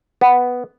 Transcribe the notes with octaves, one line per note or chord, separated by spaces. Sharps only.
B3